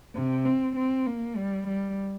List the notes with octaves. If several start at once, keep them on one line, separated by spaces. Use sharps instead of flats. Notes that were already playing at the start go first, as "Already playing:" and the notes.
C3
C4
C4
A#3
G3
G3